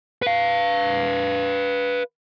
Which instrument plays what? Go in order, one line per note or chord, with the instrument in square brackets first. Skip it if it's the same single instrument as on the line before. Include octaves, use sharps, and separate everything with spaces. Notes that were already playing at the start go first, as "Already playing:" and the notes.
[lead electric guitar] B4 F5